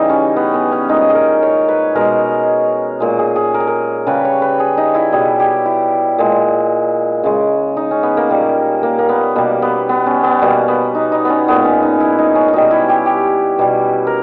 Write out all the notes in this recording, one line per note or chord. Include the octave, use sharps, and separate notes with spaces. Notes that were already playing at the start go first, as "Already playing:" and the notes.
Already playing: C#3 E3 G3 D#4
C#4
B3
B3
C#4
A#2 G#3 D#4
G#4
A#4
C#5
B4
B2 G#3 A#4
A#2 G#3
G#4
G#4
A#4
G#4
A#4
C#3 G3 B4
C#5
B4
G#4
D#4
E4
B2 G3 G#4
G4
E4
A#2 G#3
C#3 G#3
D#4
C#4
B3
A#3
A#2 G3
A#3
A#3
B3
B2 G3 A#3
B3
B3
C#4
B3
B2 G3 A#3
B3
D#4
D#4
B3 C#4
A#2 G#3 B3
C#4
D#4
E4
D#4
C#4
C#4
B2 G3 D#4
E4
G4
G4
B2 G3
A#4